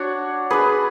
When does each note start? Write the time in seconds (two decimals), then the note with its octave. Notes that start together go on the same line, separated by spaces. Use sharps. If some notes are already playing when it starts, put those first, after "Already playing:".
Already playing: D4 F#4 C#5
0.50 D4 G#4 B4